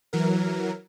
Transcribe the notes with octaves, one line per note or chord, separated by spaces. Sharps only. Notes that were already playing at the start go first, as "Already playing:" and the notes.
E3 F#3 A#4